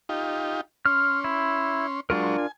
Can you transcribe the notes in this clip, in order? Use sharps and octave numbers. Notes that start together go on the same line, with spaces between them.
D#4 F4 G4
C#4 C6 F6
E4
F#3 G#3 D4 F4 A#4 C#6
G#5